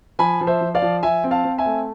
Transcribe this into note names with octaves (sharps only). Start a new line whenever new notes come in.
F3 G#5 B5
F3
C5 E5
F3
D5 F5
F3
F3 E5 G#5
C4
F5 A5
C4
E5 G#5
A3